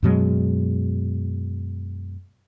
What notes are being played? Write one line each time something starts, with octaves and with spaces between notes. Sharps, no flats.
F#2 B2 F#3 G#3